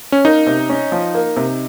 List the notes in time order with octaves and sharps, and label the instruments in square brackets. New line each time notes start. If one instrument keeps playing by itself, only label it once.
[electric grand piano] C#4
[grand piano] A#3 [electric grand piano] D#4
[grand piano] C3
C#4
F3
A#3
C3